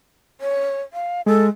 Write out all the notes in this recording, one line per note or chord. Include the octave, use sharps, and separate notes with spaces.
C#5
F5
G#3 A4